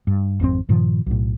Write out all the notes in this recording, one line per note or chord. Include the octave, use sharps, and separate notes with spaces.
G2
G#1 F2 D#3 C4
G2 A#2 D#3 F3
B1 A2